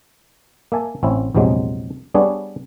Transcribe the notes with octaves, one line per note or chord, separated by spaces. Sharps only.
A#3 E5 G#5 A5
A1 C4 C#4 E4
A#1 E2 C3 F#3 G#3
G3 B3 D4 G#4 C#5